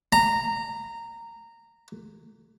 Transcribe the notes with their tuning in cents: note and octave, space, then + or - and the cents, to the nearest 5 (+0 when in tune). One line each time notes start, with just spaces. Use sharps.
A#5 -15